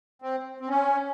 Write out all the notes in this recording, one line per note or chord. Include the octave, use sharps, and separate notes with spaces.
C4
C4
C#4